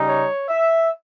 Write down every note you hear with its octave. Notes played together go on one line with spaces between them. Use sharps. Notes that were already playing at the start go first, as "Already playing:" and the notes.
Already playing: C#3 G3 D#4
C#5
E5